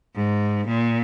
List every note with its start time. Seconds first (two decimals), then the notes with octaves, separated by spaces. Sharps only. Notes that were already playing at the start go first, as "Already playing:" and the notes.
0.16 G#2
0.68 A#2